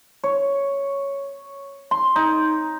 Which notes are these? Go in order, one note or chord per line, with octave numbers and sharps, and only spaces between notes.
C#5
C6
D#4